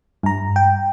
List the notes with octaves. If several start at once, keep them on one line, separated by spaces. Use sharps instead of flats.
G2 A#5
G5